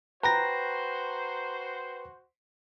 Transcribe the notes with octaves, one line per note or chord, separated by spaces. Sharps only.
F#4 B4 C5 G5 A#5 A#6